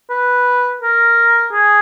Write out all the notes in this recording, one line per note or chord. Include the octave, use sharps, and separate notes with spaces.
B4
A#4
G#4